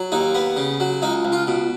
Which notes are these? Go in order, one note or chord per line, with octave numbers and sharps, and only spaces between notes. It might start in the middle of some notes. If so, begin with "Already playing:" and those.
Already playing: F#3
D#2 D#4
B3
C#3
F#3
C#2 D#4
C#2
F4
B2